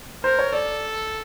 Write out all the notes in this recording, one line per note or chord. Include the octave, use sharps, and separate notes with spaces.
A#4 C5
C#5
A4 D5